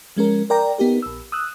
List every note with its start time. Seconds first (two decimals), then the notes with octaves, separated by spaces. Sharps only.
0.16 F3 G#3 C#4 A#4
0.50 A#4 D5 G5 A#5
0.78 B3 D#4 G4 A#4
1.02 A#1 E6
1.32 D#6 E6 F#6